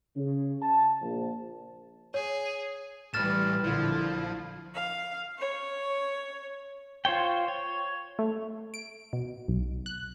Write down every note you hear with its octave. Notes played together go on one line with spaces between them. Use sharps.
C#3
A5
A#1
G#4 C#5
A2 E3 G3 B4 F6 A6 E7
A#1 D3 F3 E4
F5
C#5
F4 C5 C#5 G5
C#5
A3
D7
B2
B1
F#6